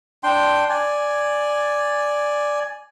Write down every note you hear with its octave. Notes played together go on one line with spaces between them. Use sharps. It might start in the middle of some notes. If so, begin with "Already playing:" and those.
D4 G5 C6
D5 G#5